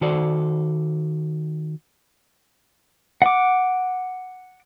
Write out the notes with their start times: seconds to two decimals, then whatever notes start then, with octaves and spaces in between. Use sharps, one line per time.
0.01 D#3 F#4 A4 C5 D5
3.22 F#5 D6